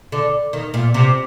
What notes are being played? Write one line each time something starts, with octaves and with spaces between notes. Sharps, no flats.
D3
D#3
A#2
C3